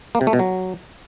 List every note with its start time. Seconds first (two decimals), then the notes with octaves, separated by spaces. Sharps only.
0.15 A#3
0.21 C3
0.27 A3
0.33 B2
0.39 F#3